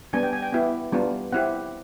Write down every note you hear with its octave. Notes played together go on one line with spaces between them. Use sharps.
G3 B3 D4 G#5
G5
G#5
G5
B3 E4 G4
G3 B3 D4 F4
C4 E4 G4 F#5